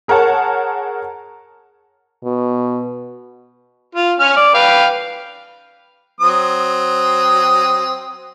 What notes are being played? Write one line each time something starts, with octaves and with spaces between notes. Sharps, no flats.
G#4 A#4 C#5 F#5 A5
B2
F4
C#4 F6
D5
B4 F5 G5
F#3 C4 D#6